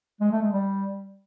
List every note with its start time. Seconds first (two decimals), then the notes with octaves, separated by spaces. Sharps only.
0.21 G#3
0.31 A3
0.42 G#3
0.52 G3